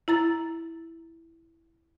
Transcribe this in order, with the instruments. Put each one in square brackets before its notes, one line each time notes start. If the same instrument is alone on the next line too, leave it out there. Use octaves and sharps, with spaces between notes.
[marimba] E4 A#5 A6